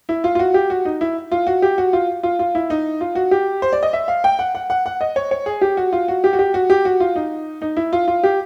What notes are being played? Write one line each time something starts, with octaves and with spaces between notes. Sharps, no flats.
E4
F4
F4
F#4
G4
F#4
D#4
E4
F4
F#4
G4
F#4
F4
F4
F4
E4
D#4
F4
F#4
G4
C5
D5
D#5
E5
F5
G5
F#5
F#5
F#5
F#5
D#5
C#5
C#5
G#4
G4
F#4
F4
F#4
G4
F#4
G4
F#4
G4
F#4
F4
D#4
D#4
E4
F4
F4
G4